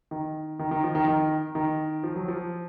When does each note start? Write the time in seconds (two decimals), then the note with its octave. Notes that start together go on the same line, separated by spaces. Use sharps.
0.11 D#3
0.59 D#3
0.71 D#3
0.84 F3
0.95 D#3
1.08 D#3
1.55 D#3
2.03 F3
2.16 F#3
2.28 F3